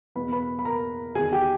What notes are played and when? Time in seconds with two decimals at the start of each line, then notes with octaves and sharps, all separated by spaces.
0.15 E2 B2 B4 B5
0.32 B4 B5
0.59 B5
0.65 A#4 A#5
1.15 E2 D#3 G#4 G#5
1.32 G4 G5